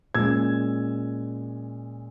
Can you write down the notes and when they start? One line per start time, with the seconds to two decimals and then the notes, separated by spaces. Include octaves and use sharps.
0.15 A#2 G#3 C#4 E6 G#6